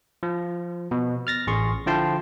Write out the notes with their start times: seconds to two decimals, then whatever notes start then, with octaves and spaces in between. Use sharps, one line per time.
0.23 F3
0.91 B2
1.27 F6 A6 A#6
1.47 A1 G#4 C6 C#6
1.86 D3 F3 E4 G5 A5 C6